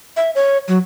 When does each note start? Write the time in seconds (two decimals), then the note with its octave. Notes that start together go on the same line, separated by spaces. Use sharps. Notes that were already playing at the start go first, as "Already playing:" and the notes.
0.17 E5
0.35 C#5
0.68 F#3